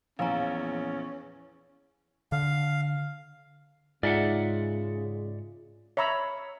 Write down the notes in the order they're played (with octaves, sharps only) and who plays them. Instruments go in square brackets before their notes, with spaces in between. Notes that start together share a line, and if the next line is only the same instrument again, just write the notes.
[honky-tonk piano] A#1 [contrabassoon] E2 [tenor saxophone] C#4 [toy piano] F5 G#5 A#5
[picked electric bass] D3 [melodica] F5
[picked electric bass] G#2 [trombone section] C#3 G#3 [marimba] F4 [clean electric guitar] D5 E5 F#5
[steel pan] C#5 E5 A#5 B5 E6